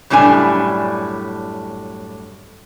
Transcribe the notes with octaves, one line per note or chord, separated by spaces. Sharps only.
F#2 A2 G3 D4 G#5